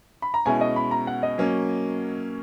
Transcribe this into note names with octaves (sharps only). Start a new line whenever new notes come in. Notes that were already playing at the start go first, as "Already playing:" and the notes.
B5
A#5
B2 G#3 C#4 E4 G#5
D#5
B5
A#5
F#5
D#5
F#3 A#3 C#4